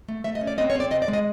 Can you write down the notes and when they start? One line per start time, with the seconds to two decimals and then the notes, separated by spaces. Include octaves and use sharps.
0.08 A3
0.24 A3 E5
0.35 D#5
0.41 C#4
0.47 D5
0.58 C4 D#5
0.70 C#5
0.75 C4 D5
0.91 C3 D#5
1.02 D5
1.08 G#3
1.13 D#5